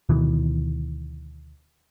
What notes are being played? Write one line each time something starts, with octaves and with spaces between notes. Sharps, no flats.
D2 B2 D#3 E3